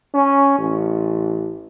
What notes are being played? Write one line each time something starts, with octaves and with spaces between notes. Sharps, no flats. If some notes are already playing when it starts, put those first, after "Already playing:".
C#4
A1